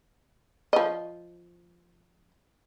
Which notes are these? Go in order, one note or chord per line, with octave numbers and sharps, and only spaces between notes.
F3 D#5